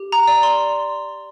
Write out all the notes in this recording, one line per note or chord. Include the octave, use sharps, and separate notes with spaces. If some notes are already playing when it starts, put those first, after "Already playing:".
Already playing: G4
A#5
D5
C6